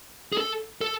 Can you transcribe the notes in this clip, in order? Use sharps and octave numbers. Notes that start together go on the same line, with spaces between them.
G#4
A4
A4